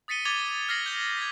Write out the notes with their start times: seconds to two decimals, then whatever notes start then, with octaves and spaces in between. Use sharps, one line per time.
0.08 D#6 A6 B6 C#7 D#7 G7
0.25 D6 G#6 A6 D#7 F7 G7
0.69 F6 G#6 A#6 C7 F#7
0.86 G6 G7
1.17 G#6 B6